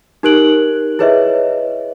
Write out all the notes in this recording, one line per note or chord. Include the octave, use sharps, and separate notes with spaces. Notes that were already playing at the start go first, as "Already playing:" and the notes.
D#4 G4 A#4 F#6 D7 F#7
E4 G#4 B4 C#5 D#5 E5